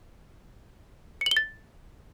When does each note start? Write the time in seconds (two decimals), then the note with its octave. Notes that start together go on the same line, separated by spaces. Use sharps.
1.21 C#7
1.26 F#7
1.31 G7
1.37 A6